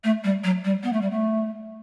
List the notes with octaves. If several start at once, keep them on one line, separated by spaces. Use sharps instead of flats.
A3
G3
F#3
G3
B3
A3
G3
A3